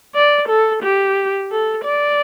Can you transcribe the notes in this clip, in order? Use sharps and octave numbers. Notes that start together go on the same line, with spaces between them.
D5
A4
G4
A4
D5